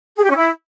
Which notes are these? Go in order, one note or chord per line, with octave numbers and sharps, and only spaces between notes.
G#4
G4
C#4
E4